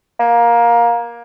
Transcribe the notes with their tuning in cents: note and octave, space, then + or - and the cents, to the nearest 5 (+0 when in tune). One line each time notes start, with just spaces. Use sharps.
A#3 +15